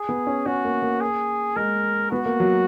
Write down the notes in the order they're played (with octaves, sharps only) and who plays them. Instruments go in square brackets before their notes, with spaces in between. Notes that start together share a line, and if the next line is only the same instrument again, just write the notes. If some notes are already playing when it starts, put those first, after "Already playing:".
Already playing: [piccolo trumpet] G#4
[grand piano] B3
C#4
[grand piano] C#4 [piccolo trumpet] F#4
[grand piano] A#3
A#3
[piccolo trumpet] G#4
[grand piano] G#3 [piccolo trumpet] A#4
[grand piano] B3 [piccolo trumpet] F#4
[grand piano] A#3
F#3